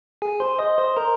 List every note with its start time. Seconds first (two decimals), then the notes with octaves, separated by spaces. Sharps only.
0.22 G#4 G#5
0.40 C5 C6
0.59 D#5 D#6
0.78 C5 C6
0.96 A#4 A#5